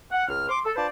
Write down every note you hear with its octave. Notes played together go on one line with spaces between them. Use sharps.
F#5
C#2 F6
C6 D6
A4
D4 F4 B4 C5 D5 A5